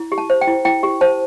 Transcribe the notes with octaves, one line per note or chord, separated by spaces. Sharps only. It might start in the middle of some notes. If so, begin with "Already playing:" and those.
Already playing: E4
G4
A5
C5
G5
E4
E4 G5
G4
C5 A5